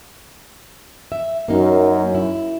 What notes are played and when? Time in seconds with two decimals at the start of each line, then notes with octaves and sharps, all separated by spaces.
1.12 E5
1.48 F#2 F#3 A#3 D#4
2.15 E4